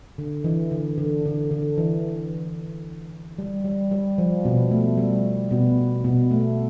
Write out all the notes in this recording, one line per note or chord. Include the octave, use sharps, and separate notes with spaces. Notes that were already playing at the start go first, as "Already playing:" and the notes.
D3
E3
D3
D3
D3
D3
E3
G3
G3
G3
F3
B2 B3
A3
G3
B2 B3
B2 B3
A3